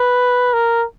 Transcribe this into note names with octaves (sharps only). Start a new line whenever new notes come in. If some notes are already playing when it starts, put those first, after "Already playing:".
Already playing: B4
A#4